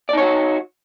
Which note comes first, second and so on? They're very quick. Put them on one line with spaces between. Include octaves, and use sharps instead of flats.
D5 D#4 C#5 F#4